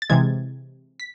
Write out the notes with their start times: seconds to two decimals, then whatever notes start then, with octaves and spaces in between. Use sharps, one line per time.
0.02 A6
0.10 C3 E3 G#3 G#6
1.00 B6